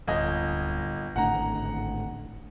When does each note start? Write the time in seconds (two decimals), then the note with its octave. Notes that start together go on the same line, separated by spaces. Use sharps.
0.07 D1 G1 D#5
1.16 G#1 A2 D3 F#5 A#5